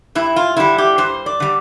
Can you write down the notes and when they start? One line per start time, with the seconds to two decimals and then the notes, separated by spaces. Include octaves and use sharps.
0.15 G2 E4
0.36 F4
0.57 D3 G3 E4
0.78 G4
0.98 G2 C5
1.26 D5
1.40 D3 G3